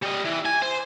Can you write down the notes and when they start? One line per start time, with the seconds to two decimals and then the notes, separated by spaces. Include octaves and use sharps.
0.02 G3 D#5
0.25 E3
0.46 G#5
0.62 C5